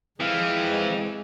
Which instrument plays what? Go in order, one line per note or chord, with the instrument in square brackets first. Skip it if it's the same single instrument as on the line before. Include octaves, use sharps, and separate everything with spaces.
[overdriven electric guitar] E3 [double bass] G#3 [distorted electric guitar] C4 F5